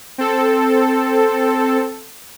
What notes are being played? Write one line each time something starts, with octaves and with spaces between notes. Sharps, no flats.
C4 A4